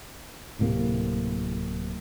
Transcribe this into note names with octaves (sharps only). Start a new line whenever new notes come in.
D1 A2 C3 A#3